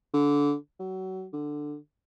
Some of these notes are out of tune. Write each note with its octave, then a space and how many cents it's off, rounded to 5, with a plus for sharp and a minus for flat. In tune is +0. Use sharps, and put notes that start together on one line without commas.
D3 -20
F#3 +25
D3 +10